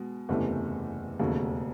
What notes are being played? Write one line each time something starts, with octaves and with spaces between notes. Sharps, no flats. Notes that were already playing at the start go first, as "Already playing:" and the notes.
Already playing: B2 G#3
F#1 E2 C3 E3 A3
E1 D#2 C#3 F#3 A3